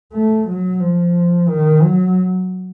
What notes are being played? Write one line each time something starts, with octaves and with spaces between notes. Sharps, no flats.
A3
F#3
F3
D#3
F#3